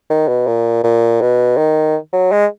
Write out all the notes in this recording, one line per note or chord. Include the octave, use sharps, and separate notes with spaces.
D#3
B2
A#2
A#2
B2
D#3
F#3
G#3